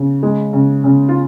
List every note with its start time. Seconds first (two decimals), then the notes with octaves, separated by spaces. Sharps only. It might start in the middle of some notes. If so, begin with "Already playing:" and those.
Already playing: C#3
0.23 G#3
0.53 C#3
0.84 C#3
1.09 F4